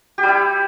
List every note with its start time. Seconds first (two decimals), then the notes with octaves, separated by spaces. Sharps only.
0.18 G4
0.23 G3
0.28 E4